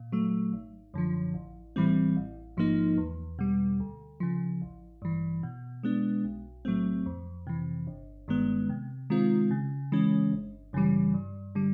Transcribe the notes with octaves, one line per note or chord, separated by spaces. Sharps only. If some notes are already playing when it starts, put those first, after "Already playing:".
Already playing: A#2
F#3 A3
G#1
F#2 D3 F3
A1
A2 E3 G3 C4
A1
G#2 F3 A#3 D#4
E2
B2 G3
D2
C#3 F3
A1
G2 E3
B2
G#3 B3 D4
B1
A2 F#3 A3 C4
F2
C3 E3
G1
G2 D#3 G#3 B3
C3
D#3 G#3 C4 F4
C#3
E3 G#3 C#4
G1
F#2 C#3 E3 G3
G2
D3 G3